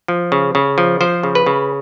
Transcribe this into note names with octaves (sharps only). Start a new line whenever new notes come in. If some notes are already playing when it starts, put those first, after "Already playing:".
F3
C#3
C#3
F3
F3 C5
C#3
B4
C#3